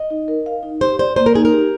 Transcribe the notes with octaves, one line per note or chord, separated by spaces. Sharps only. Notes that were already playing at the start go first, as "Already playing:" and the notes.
Already playing: D#5
D#4
A#4
F5
D#4
G4 C5
C5 D5
A#3 C5
A#4
D#4 G#4
A#4
G4